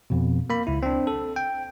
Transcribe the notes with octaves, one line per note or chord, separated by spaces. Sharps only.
F2 B2
A#3 B5
C#2 E4
C4 D4
A4
G5